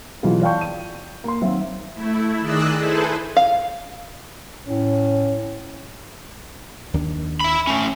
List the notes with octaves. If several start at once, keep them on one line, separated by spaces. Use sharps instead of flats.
B2 E3 F#3 F4 G#4
D5 F5 G5 A5 C#6 G6
D#7
A#3 C6
D#3 F#3 C4 F#4 E5 F5
A3 E4
D#3 G#4 D5 D#5 E6 F#6
E4 G#4 A4 B4 C5
F5
A2 C#4
D#2 D#3 D4
E5 B5
A3 C#4